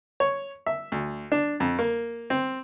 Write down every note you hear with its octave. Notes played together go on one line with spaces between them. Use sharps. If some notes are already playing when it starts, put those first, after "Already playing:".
C#5
E5
D2
D4
F2
A#3
C4